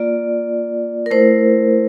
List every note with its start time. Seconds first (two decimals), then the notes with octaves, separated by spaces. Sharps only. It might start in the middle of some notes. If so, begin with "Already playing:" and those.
Already playing: A#3 F4 D5
1.06 A#4
1.11 A3 E4 C5